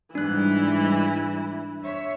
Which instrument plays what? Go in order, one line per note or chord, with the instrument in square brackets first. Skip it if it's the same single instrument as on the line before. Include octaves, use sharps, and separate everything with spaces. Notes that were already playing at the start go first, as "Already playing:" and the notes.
[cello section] G#2 G3 [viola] E3 E4 [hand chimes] D4 F#6
[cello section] C#5 E5